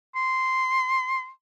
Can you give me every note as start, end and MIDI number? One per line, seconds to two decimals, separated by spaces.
0.15 1.29 84